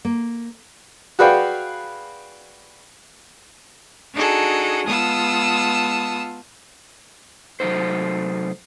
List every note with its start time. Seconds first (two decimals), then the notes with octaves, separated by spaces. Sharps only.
0.05 A#3
1.19 F#4 G#4 B4 D5 F5 G5
4.14 D4 D#4 F#4 G#4 A4
4.86 G#3 B3 F4 A5 D#6 E6
7.60 C3 F#3 G#3 A3 D#4 C5